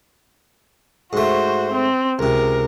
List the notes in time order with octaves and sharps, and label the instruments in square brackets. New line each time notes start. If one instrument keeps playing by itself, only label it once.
[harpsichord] G#2 A3 [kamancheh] F#4 C5
[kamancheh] C4
[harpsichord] C#2 C3 [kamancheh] A#4